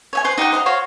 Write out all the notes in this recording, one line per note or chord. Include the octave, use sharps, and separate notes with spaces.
C#5 E5 G#5
B4 C5 C6
D#4 G4 F#5 G5
C5 D#5 F#5 A#5
F#4 C5 C#5 F5